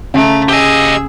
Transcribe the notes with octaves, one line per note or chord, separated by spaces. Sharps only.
C#3 A3 A#5
G4 G#4 D#5 E6